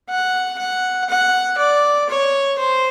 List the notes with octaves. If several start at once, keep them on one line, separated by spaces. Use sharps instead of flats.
F#5
F#5
F#5
D5
C#5
C5